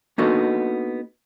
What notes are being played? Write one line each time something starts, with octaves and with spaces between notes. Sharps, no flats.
A#3 B3 D4 D#4 F#4 A4